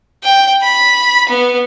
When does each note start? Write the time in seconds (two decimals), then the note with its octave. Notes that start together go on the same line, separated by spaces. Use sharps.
0.23 G5
0.62 B5
1.29 B3